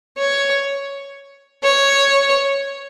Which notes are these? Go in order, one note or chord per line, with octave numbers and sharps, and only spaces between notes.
C#5
C#5